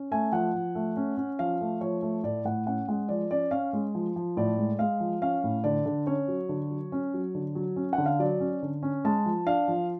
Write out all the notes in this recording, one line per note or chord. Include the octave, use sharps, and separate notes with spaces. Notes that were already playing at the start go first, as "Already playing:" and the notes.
Already playing: C#4
A3 G#5
F3 F#5
F3
A3
C#4
C#4
F3 F5
A3
F3 C#5
A3
A2 D5
A2 F#5
C#4 F#5
G#3 F#5
F3 D5
C#4 D5
C#4 F5
G#3
F3
F3
A2 D5
G#3
G#3 F5
F3
C#4 F5
A2
D3 D5
D3
C#4 C#5
F#3
D3
F#3
C#4
F#3
D3
F#3
C#4
F#5
D3
F5
F#3 D5
C#4
D3
C#4
G#3 A5
F3
D4 F5
F3